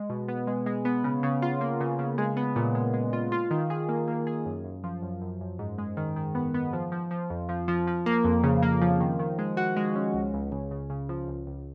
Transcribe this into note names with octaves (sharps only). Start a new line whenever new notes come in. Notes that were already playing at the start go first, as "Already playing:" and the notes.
Already playing: G#3
B2
B3
G#3
G#3
B3
C#3
C#3
F4
A#3
C#3
C#3
G#3
B3
A#2
G#3
G#3
F4
F4
D#3
G#4
A#3
A#3
G#4
F#2
F#2
F3
F#2
F#2
F#2
G#2
G#3
D#3
D#3
B3
B3
F3
F3
F3
F2
F3
F3
F3
A#3
F2
C#3
A#3
F3
D#3
D#3
G#3
F#4
G#3
C#4
C#2
C#2
C#3
C#3
C#3
F3
C#2
C#2